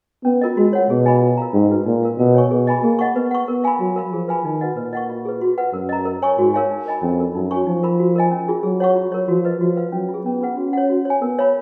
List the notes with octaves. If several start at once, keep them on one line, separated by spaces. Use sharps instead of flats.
B3 C#4
F4 A#4 D#5
G#3 F#4
C#5 F#5
B2 G#4
D#5 G#5 B5
F4
A#4 F5 A#5
G#2 C#4
F#4 B4
A#2 D#4
A#4 F5
B2 A#4
C#5 G#5 C#6
B2 G#4
D#5 G#5 B5
A#3 G#4
D#5 F#5 C#6
B3 B4
F#5 C#6
B3 A#4
F5 G#5 B5
F#3 F#4
A#4 F5 B5
F3 G#4
B4 F5 G#5 B5
D#3 D#4
F#4 B4 D#5 F#5
A#2 B4
D#5 F#5 C#6
F4
G#4 B4
F#4
B4 F#5
F#2 A#4
D#5 A#5
A#4
C#5 G#5 C#6
G#2 F#4
A#4 C#5 F5 G#5
D#4
A#4 D#5 G#5 B5
F2 C#4
F4 A#4
F#2 D#4
F#4 C#5 G#5 C#6
F3 D#4
A#4 F5 B5
F#4
A#4 D#5 G#5
C#4
F4 G#4
F#3 G#4
C#5 F#5 C#6
F4
A#4 C#5
F3 F#4
B4 D#5
F3 F#4
B4 F5
F#3 C#4
F4
G#4
B3 C#4
F4 G#4 B4 F#5
C#4 F#4
C#5 F#5
F#4
C#5
G#5
B3 A#4
C#5 F5 B5